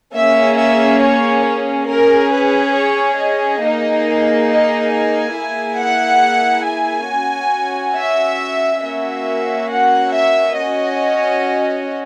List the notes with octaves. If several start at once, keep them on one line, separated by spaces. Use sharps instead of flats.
A#3 C#4 G#4 E5
E5
C#5
C#4 G#4 A#4
B4
C#5
D#5
A#3 D#4 G#4
D#5
G#5
A#3 E4 G#4
F#5
G#5
C#4 F#4
E5
A#3 C#4 F#4 E5
F#5
E5
C#4 F#4 D#5